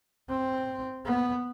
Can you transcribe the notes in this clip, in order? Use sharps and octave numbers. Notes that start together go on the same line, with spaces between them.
C4
B3